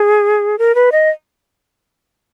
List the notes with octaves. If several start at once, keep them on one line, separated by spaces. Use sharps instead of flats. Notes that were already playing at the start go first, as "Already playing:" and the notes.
Already playing: G#4
A#4
B4
D#5